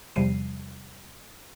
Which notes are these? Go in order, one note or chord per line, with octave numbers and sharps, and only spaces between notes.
E2 C3 F3 G3 C7 D#7